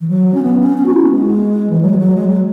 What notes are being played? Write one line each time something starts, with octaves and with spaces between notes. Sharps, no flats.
E3
F#3
C#4
B3
C#4
C#4
F#4
E4
B3
G#3
E3
F#3
G#3
F#3
G#3
F#3